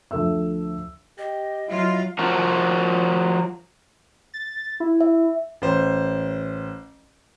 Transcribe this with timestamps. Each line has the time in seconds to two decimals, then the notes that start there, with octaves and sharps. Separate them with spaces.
0.11 D2 F3 A4 E5 E6
1.18 G4 D#5
1.68 F#3 E4 F4
2.19 F3 F#4 A#4
4.34 A6
4.80 E4
5.01 E5
5.62 A1 C5